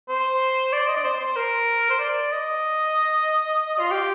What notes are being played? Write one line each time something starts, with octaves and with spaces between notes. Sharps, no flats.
C5
D5
D#5
D5
C5
C5
A#4
C5
D5
D#5
F4
G4